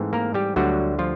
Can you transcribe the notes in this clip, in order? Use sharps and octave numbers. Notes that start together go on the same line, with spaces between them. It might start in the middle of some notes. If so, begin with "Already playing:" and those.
Already playing: G#2 E3 A3 C4
A#3 A#4
G3 G4
D2 D3 F#3 G3 F#4
F3 F4